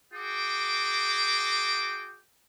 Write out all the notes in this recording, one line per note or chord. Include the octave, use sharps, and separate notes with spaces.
F#4 G#4 G5 D6